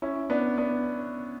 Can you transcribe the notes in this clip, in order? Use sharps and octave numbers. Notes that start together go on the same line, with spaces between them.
C#4 E4
B3 D4
B3 D4